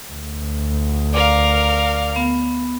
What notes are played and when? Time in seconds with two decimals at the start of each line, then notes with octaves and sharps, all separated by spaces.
0.13 D2
1.13 A#4 D5 F5 D6
2.16 B3